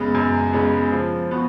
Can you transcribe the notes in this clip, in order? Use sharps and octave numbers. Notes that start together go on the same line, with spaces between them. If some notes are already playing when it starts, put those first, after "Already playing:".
Already playing: F#2 C#3 G#3 B3
F#2
C#3 G#3 B3
F3
B3 F#4